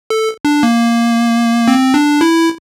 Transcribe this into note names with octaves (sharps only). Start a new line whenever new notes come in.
A4
D4
A#3
C4
D4
E4